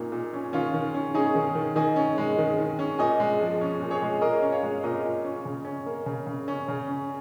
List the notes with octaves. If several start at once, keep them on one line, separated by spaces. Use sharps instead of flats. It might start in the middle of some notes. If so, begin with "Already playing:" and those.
Already playing: A#2 A#3 C#4 D#4
A#2
C#4
D#3 C#4 F4
D#3
C#4
C#4 D#4 G#4
D#3
D#3
D#3 D#5 G#5
C#4
G#3
D#3
D#3
C#4
A#2 D#5 G#5
G#3
F3
C#4
A#2
G#4 C#5
G#3
A#2 A#4 D#5
C#4
C#5 F5
G#3
A#2 A#4 D#5
A#2
C#4
C#3
C#4
A#3
C#3
C#3
C#4
C#3
C#4